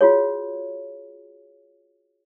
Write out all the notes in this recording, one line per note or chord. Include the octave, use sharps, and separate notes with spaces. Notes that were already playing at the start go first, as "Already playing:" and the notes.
F4 F#4 G#4 C#5